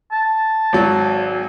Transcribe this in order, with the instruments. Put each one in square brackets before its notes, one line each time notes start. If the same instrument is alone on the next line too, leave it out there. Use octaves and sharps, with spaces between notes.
[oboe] A5
[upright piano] G#1 F#3